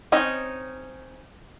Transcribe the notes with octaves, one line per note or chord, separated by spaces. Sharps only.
C4 C#4 D#4 D#5